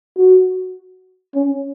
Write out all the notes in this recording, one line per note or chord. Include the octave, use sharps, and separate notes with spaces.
F#4
C#4